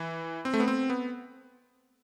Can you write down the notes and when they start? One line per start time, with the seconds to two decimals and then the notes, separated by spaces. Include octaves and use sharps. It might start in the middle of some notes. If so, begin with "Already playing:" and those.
Already playing: E3
0.45 C4
0.54 A3
0.60 B3
0.68 C4
0.90 B3